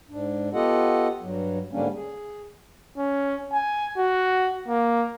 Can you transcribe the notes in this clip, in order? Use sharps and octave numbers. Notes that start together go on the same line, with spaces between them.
G#2 D4
B3 F4 G4 A4 D#5 F#5
G2 F#3
G#2 D3 G3 A#3 C#4 D4
G#4
C#4
G#5
F#4
A#3